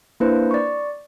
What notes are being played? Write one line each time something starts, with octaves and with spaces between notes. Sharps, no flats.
A#3 D4 E4 B4 C5
D5 C#6